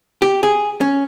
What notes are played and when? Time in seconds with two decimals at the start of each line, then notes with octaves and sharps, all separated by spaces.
0.22 G4
0.43 G#4
0.81 C#4